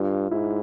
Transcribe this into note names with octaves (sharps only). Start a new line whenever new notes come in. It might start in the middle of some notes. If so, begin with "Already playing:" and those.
Already playing: G2 F4
G#2 E4